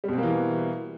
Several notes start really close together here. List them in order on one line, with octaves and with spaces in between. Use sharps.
G3 B2 C4 A#3 E3